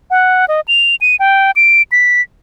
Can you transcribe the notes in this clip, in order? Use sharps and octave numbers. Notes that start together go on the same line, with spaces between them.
F#5
D#5
F7
D#7
G5
D7
B6